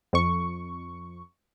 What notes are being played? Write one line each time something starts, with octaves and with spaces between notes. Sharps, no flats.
F2 C#6